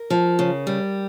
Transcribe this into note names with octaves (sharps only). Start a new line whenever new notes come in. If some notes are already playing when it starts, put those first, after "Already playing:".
Already playing: A#4
F3
C#3
G3